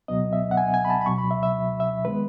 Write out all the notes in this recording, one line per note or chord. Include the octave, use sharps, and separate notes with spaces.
C#2 B2 F#3 B3 D#5
E5
F#5
G#5
G#5
B5
A5
B5
C#2 B2 F#3 C#6
B5
E5
E5
E5
D#3 G#3 B3 B4